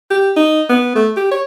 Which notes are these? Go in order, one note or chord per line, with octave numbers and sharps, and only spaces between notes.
G4
D#4
B3
A3
G4
C#5